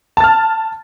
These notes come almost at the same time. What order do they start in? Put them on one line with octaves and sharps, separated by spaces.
A5 A6 F6